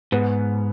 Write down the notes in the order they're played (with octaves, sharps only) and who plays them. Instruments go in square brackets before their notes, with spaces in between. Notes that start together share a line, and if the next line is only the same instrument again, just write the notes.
[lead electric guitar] G#2 [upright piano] B3